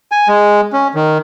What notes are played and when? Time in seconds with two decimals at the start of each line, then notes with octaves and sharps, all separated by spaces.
0.12 G#5
0.28 G#3
0.73 C#4
0.95 D#3